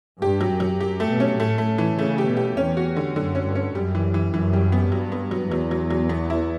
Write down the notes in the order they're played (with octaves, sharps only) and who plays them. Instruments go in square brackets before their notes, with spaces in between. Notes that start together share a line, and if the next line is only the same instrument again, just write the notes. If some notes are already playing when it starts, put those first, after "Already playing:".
[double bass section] G2 [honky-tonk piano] G4
[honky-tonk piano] F#3
[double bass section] F#2
[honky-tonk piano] F#3
[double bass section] F#2 [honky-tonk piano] G4
[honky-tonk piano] A3
[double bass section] B2
[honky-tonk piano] C#4
[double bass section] A2 [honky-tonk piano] A3
[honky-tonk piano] A3
E3
[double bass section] C#3 [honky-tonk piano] A3
[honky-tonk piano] G4
[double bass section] B2
[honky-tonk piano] G4
[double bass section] E2 [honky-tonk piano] C#4
[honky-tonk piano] F#4
D3
[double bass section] F#2 [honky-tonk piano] D3
[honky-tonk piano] C#4
[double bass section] G2
[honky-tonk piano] C#4
[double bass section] F#2 [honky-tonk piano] G3
[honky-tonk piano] E3
E3
[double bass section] F#2 [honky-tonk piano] E3
[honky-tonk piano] G3
B3
[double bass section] G2 [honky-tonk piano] F#3
[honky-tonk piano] B3
F#3
[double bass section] E2 [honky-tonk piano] F#3
[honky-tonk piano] F#3
F#3
B3
E4